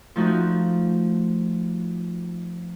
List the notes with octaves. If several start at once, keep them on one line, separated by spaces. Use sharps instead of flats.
F3 A3 D#4 F#4